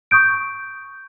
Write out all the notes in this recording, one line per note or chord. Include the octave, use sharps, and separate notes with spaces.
C#6 D#6 G6 D7